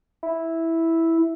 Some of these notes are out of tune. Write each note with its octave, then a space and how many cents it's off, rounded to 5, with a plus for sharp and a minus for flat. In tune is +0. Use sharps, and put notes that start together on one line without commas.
E4 -5